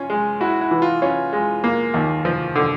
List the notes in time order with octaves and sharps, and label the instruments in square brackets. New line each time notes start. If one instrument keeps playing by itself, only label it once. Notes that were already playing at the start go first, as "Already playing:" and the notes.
Already playing: [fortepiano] C#4 [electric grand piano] F4
[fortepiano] G#3
[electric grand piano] E4 [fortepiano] F#4
[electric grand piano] E4
[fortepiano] E3
[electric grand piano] F4
[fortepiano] C#4 [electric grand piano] F4
[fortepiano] G#3
A#3
D#2
F3
D3